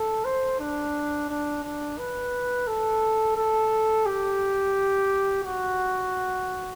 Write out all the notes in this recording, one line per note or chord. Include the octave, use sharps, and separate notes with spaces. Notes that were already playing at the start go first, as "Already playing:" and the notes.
Already playing: A4
C5
D4
D4
D4
B4
A4
A4
G4
F#4